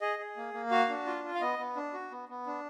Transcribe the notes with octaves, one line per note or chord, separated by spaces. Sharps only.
G#4 D#5
G#4
A#3
A#3
F#4 F5
D4
F4
F4
F5
B3 D#5
B3
D4
F#4
B3
B3
D4